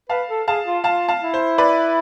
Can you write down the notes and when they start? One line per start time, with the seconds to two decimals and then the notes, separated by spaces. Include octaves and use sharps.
0.09 B4 F5 A5
0.29 A4
0.48 G#4 F5 A5
0.66 F4
0.84 F4 F5 A5
1.08 F5 A5
1.21 E4
1.34 C5
1.58 B4 D5